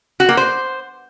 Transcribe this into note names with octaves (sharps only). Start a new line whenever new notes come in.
F#4
A#3
C5